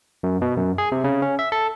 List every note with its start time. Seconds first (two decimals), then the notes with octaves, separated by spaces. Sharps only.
0.23 F#2
0.42 B2
0.57 F#2
0.78 G#4
0.92 C3
1.04 C#3
1.22 C#4
1.39 E5
1.52 A4